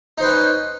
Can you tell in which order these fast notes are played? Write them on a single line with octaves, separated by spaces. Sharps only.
D#4 C5 B4 F#5 C#4